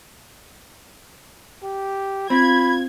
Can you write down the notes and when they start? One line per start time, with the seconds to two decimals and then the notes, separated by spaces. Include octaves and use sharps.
1.63 G4
2.30 C4 F4 B5 G#6